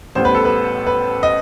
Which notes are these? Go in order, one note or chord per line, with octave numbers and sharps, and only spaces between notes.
A1 A2 G3 B3 C5
B4
A4
B4
B4
D#5